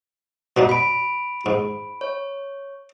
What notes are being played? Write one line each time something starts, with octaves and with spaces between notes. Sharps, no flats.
B2 D4 D#4
B5 D7
G#2
C#5